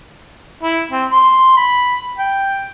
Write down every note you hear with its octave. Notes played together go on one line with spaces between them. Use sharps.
E4
C4
C6
B5
G5